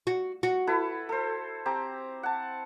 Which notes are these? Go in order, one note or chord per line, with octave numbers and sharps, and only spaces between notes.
F#4
F#4
E4 A4 B4
A4 C5
C4 G4 A#5
F#5 A5